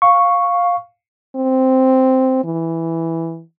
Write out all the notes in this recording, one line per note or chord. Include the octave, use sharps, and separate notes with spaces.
F5 C#6
C4
E3